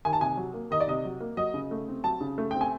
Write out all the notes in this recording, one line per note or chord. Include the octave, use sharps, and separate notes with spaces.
D#3 G#5
A5
C3 G#5
F#3
A#3
D#3 D#5
D5
C3 D#5
F#3
A#3
F#3 D#5
C#3
A3
C4
F#3 A5
C#3
A3
C4 G5
G#5